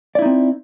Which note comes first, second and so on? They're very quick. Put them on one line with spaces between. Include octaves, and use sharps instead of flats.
D5 E4 D#4 C4